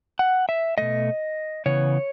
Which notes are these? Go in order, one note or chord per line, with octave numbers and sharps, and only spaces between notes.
F#5
E5
B2 A3 D#5
C#3 E3 B3 C#5